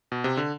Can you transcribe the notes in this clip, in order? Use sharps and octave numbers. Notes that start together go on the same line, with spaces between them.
B2
C3
D3